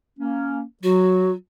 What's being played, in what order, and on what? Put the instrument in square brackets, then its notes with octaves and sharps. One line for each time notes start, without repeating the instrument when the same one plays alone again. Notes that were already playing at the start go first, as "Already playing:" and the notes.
[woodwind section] A#3 C#4
[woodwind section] F#3 [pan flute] F#4